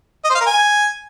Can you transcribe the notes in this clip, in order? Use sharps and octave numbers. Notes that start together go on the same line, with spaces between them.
D#5
C5
F5
A#4
G#5